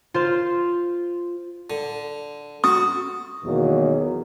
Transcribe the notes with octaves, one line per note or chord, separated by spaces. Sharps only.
F4 C5 C6
D3
F#4 D#6
E2 B2 D#3 F#3 A#3